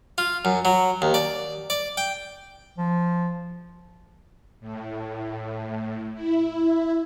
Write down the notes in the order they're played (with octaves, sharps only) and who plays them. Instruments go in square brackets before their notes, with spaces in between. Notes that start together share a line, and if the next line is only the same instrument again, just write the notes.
[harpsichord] F4
F#2
F#3
D#2
D5
D5
G5
[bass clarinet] F3
[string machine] A2
E4